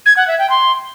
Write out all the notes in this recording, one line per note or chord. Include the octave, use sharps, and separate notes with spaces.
G#6
F#5
E5
G5
C6